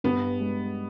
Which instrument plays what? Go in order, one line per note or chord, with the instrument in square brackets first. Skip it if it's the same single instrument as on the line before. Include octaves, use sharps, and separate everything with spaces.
[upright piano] G2 [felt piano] B3
[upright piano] G#3